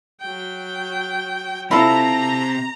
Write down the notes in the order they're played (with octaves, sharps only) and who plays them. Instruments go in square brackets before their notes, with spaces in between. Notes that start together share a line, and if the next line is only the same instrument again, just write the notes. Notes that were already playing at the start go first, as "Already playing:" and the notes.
[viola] F#3 G5
[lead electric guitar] C3 C4 [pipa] E4 F4 A4 [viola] A#5